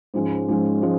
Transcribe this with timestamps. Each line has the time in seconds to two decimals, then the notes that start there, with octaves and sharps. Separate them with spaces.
0.14 G#2 F3 G#3 C#4
0.48 G#2 F3 G#3 C#4
0.82 F3 G#3 C#4